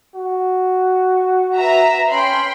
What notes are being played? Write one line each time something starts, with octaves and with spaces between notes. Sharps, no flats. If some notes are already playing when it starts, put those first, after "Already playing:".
F#4
B4 E5 A#5
C#4 G5 B5 C6